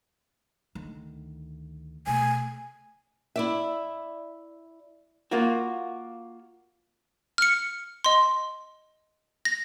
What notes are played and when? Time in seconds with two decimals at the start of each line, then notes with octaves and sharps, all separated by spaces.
0.75 D2 D#3
2.07 B2 A3 G#5
3.36 E4 D5 E5
5.31 A#3 F4 F#4
7.38 F6 C#7
8.04 D#5 C6
9.45 A#6